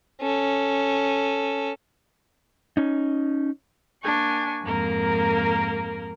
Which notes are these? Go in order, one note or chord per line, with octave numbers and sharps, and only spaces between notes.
C#4 A4
C#4 D#4
A#3 D4 G#5 C#6
F2 G#2 A#3 A#4